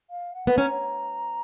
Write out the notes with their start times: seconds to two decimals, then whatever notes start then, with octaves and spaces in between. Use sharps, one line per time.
0.10 F5
0.34 F#5
0.47 B3
0.58 C#4 A#5